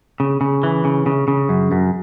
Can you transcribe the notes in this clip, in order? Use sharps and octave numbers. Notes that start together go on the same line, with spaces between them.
C#3
C#3
E3
C#3
C#3
C#3
F#2
F#2